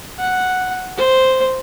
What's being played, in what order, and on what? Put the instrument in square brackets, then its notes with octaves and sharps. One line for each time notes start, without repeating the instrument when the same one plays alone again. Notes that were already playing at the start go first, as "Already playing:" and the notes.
[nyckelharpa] F#5
C5